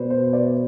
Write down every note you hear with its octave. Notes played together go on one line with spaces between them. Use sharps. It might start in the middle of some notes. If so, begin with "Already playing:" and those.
Already playing: B2 B4 C5 D5
C5
D5